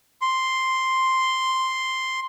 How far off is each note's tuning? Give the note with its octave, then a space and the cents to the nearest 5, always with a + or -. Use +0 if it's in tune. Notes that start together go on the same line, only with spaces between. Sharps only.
C6 +0